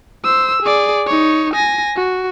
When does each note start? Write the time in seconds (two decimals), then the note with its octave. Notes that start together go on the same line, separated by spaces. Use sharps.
0.24 C5 E6
0.63 G#4 D5
1.07 D#4 C#5
1.54 G#5 A#6
1.96 F#4